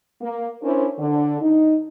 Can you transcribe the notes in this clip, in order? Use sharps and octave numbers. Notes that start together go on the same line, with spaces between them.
A#3
C#4 D4 E4 A#4 C5
D3
D#4